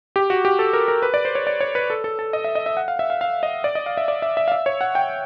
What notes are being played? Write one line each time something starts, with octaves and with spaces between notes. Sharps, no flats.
G4
F#4
G4
A4
A#4
A#4
B4
D5
C5
C#5
D5
C#5
B4
A4
A4
A4
D#5
E5
D#5
E5
F#5
F5
E5
F5
F5
D#5
D5
D#5
F5
E5
D5
E5
E5
F5
E5
C#5
F#5
G5